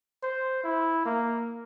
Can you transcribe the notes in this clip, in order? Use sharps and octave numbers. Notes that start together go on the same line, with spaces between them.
C5
E4
A#3